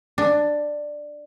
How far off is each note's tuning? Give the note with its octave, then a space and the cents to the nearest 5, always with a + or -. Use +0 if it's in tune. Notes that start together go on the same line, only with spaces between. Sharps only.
D4 +10